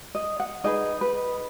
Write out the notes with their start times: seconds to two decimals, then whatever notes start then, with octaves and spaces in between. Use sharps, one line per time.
0.15 D#5
0.40 F#5
0.64 D#4 G#4 B4 D#5
1.01 B4